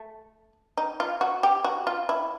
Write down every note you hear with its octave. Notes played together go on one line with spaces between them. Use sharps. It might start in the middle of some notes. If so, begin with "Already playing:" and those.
Already playing: A3
D#4
F4
F#4
G4
F#4
F4
E4